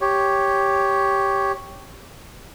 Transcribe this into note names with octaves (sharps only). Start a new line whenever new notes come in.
G4 C#5